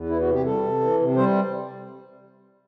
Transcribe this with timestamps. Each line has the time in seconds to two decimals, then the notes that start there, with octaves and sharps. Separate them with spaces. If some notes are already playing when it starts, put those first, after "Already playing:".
Already playing: E2
0.09 E3 E4
0.21 F#4
0.27 C3
0.33 G4
0.45 G3 A4
0.63 C3
0.81 E3
0.99 C3
1.16 G3 C5